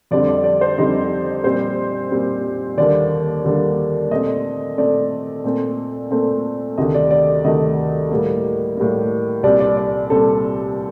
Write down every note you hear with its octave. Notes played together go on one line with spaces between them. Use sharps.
F2 D3 G3 C4 D5
D5
D5
C5
F2 D3 G3 C4 D#4
A#2 G3 C4 C5
A#2 G3 C4
D#2 D3 G3 A#3 D5
D#2 D3 G3 A#3
A#2 A3 C4 D#5
A#2 A3 C4 D5
A#2 A3 C4
A#2 A3 C4
D2 C3 D#3 A3 D#5
D5
D5
D2 C3 D#3 A3 D#5
A2 G3 A#3
A2 G3 A#3
C2 A#2 G3 C4 D5
D5
D5
C2 A#2 G3 C4 A4